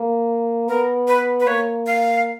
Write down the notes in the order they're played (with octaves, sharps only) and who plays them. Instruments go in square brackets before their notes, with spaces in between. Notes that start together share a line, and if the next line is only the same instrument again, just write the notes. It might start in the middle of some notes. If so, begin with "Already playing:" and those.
Already playing: [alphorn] A#3
[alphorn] B3 [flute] A#4
[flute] B4
B4
[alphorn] A#3 [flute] C#5
[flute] F5